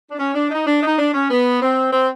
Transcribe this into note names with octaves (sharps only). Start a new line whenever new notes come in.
D4
C#4
D4
D#4
D4
D#4
D4
C#4
B3
C4
C4